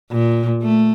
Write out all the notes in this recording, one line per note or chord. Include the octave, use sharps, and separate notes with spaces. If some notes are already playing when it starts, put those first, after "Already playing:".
A#2
A3